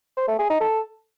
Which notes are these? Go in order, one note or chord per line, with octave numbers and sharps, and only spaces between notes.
C5
A3
G#4
D#4
A4